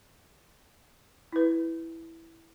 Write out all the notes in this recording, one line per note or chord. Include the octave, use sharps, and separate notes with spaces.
E4 B4